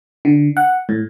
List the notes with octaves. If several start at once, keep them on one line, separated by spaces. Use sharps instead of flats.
D3
F#5
A2